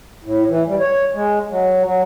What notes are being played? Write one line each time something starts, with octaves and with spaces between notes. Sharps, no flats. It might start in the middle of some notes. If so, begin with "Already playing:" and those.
A2
E3
G3
C#5
G#3
F#3
F#3